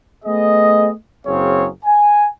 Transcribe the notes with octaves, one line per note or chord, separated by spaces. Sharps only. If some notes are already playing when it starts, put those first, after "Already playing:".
A3 B3 G#4 D#5
F#1 F#3 C4 G#4 C#5 F5
G#5